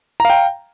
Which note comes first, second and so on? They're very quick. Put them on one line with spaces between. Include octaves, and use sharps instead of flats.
A#5 F5 G5